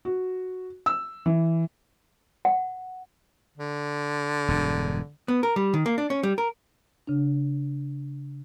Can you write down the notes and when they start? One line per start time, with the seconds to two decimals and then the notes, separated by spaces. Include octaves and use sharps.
0.05 F#4
0.86 E6
1.26 E3
2.45 F#5
3.58 D3
4.48 E1 G2
5.28 B3
5.43 A#4
5.56 G3
5.74 D#3
5.86 A#3
5.98 D4
6.10 C#4
6.23 G3
6.38 A#4
7.07 C#3 D4